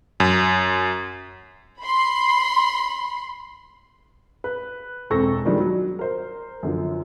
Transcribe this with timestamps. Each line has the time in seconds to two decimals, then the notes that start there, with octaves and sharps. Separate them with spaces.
0.20 F#2
1.83 B5 C6
4.44 B4
5.10 E1 C4 A4 C#6 A#6
5.45 D#3 F3 G3 G#3 D4
5.60 F#3
5.99 A#4 C5
6.63 F#2 D3 F3